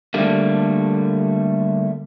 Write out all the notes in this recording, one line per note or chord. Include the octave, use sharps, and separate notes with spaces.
D3 G3 A3 A#3